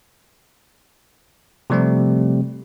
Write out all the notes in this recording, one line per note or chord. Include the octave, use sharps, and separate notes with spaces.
C3 F3 G3 A3 C4